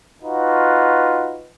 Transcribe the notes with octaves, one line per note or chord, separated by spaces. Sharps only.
D#4 F4 F#4 B4